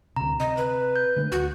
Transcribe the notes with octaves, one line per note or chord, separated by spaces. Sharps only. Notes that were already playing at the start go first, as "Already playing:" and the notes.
D2 C3 A#5
C3 D#5
B4
G6
D3 G#3 A3
D2 F#4